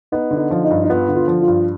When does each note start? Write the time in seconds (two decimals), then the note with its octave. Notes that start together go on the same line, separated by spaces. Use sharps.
0.12 B3 D#4
0.31 D3
0.37 D#4
0.51 F3
0.64 D#4
0.71 G2
0.84 D#4
0.89 B3 F4
1.08 D3
1.16 F4
1.28 F3
1.42 F4
1.48 G2